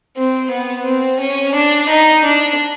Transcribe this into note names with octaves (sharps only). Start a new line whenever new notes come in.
C4
B3
C4
C#4
D4
D#4
D4